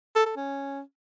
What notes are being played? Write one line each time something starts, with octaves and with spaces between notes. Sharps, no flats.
A4
A4
C#4